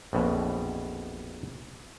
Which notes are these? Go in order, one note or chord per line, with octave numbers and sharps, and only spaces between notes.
A#1 F2 B2 F#3